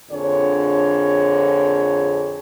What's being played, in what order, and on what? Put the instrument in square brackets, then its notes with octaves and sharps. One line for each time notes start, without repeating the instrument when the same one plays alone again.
[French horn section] F2 A#2 D3 D4 G#4 C#5